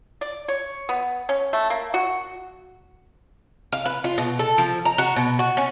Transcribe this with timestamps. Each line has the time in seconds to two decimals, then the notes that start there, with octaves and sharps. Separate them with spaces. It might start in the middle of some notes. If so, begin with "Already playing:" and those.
0.21 D5
0.48 C#5
0.89 B3
1.29 C#4
1.53 A3
1.70 A#3
1.94 F#4
3.73 F5
3.86 B4
4.04 F4
4.18 B2
4.39 A4
4.58 F3
4.85 A#5
4.98 F#4
5.16 B2
5.39 F#4
5.57 C#4